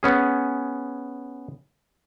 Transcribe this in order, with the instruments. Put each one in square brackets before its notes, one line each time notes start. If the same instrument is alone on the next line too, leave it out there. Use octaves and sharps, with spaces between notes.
[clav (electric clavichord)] B3 C#4 G#4